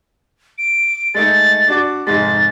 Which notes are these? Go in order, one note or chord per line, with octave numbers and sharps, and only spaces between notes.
D7
G#3 A3 D#4 A6
D4 F#4 D5
F1 G#2 G#3 A6